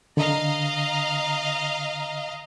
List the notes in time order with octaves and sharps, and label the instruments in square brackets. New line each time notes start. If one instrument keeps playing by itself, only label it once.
[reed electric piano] D3 [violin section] D#5 F5 A#5